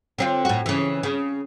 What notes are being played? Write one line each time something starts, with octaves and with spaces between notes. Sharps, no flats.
D3 C4 F4
A2 F#4
C#3 E3
C#3